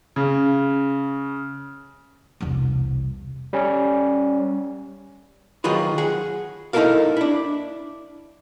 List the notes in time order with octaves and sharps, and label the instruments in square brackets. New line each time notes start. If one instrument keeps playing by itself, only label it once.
[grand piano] C#3
[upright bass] E1 C2
[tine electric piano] G3 C#4
[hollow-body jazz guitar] D#3 F#3 F4 G#4 B4
G#4 F#5
D#4 E4 G4 A4 A#4 F5
D4 E4